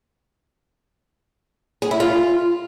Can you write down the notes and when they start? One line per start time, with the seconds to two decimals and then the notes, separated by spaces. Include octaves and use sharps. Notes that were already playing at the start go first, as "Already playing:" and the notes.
1.82 G#4
1.91 E4
2.00 F4